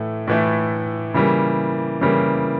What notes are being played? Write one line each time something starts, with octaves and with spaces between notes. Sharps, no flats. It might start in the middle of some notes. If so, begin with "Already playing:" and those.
Already playing: A2 E3 A3
A2 E3 A3
C#3 E3 G3 A#3
C#3 E3 G3 A#3